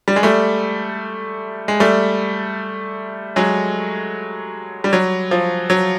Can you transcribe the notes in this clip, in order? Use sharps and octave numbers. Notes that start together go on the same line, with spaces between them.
G3
G#3
G3 A3
G#3
G3 A3
F#3 G#3
G3
F#3
F3
F#3